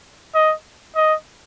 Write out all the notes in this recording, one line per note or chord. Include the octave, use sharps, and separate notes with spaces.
D#5
D#5